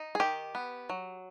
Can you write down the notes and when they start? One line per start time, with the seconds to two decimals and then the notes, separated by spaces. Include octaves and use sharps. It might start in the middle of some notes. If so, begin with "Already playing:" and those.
Already playing: D#4
0.15 G#4
0.20 D#3 G4
0.55 B3
0.90 F#3